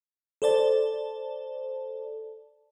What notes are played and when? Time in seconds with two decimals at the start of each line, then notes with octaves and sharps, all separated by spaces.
0.42 A4 C5 D5 A5